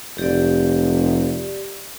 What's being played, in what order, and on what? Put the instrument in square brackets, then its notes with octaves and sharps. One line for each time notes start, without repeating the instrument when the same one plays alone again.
[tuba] F1 [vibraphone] G4 D5